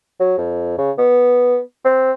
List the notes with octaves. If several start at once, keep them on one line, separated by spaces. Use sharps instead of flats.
F#3
F2
C#3
B3
C4